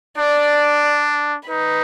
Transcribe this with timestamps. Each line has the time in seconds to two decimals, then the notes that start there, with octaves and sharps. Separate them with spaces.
0.18 D4 D5
1.49 D#4 B4